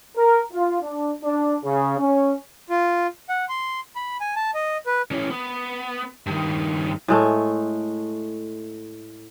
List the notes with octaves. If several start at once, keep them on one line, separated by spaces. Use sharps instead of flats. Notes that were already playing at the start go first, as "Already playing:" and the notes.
A#4
F4
D4
D4
C#3
C#4
F4
F#5
C6
B5
G#5
A5
D#5
B4
E3 C#4
B3
G2 D#3
A2 G#3 A3